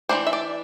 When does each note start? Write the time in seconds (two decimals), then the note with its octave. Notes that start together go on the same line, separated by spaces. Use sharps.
0.09 E3 A#3 D4 C5
0.27 E5
0.33 D5